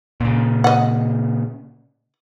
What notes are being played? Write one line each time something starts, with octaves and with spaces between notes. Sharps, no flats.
A#2 C#3
D#5 F#5